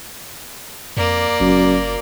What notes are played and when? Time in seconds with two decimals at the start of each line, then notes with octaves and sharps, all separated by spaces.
0.97 F2 A#3 D5
1.40 F#1 F#2